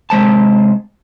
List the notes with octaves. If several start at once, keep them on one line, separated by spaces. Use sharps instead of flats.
C3 G#3 C5 A5